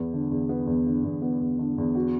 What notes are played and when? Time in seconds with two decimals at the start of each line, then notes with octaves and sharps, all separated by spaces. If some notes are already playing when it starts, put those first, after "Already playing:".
Already playing: E2 B3
0.13 D3
0.32 E2
0.49 B3
0.67 E2
0.86 D3
1.04 E2
1.22 B3
1.40 E2
1.59 D3
1.78 E2
1.95 F#4